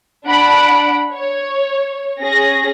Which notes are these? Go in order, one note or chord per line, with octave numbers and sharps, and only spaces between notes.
D4 F#5 B5 D7
C#5
C#4 G#4 A#6